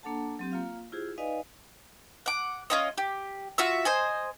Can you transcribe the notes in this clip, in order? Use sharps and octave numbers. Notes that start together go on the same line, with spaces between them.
A#3 D4 A4 F#5 A5
F#3 C4 G4
A#3 F4 F5
E4 F4 G4 G#4 C5
D#4 B4 D5 D#5 F5 G#5
F#5 D6
C#4 F4 D#5
G4
F4 F#4 E5 E6
C5 D#5 G#5